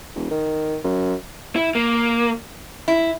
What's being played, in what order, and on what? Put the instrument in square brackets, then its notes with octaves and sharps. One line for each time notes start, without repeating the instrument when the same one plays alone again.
[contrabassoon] E1
D#3
F#2
[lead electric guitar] E4
A#3
[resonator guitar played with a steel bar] E4